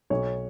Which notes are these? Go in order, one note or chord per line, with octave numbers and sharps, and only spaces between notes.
B1 C#5